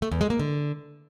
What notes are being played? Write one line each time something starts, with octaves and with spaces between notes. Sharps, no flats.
A3
E2
G#3
A#3
D3